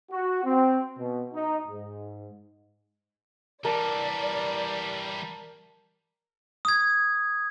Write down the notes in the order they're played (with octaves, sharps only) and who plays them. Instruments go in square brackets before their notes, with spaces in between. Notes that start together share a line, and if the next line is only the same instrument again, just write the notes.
[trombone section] F#4
C4
B2
D#4
G#2
[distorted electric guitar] E3 G3 [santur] A#4 A5 [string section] D5
[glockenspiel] D#6 G#6